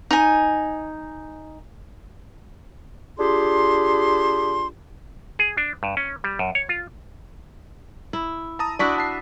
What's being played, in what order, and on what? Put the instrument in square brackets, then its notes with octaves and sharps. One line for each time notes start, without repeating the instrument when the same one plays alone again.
[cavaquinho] D#4 G#5
[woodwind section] D4 F4 G4 G#4 C6
[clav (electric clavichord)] G#4
D4
G2
C#4
G3
F#2
C#5
F4
[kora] E4
[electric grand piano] A5 A#5 D#6
[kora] D4 E4 F#4 [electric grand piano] D5 C#6 B6
[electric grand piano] A5 C7